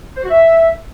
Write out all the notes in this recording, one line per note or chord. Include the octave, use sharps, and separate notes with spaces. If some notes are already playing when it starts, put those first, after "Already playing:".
C5
F#4
E5